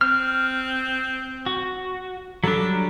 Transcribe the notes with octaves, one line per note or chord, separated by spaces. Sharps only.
C4 F6
F#4
F#3 G3 D4 A4